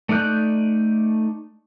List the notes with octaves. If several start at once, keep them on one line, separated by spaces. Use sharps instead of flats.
A3 D#4 D5 F#6 G6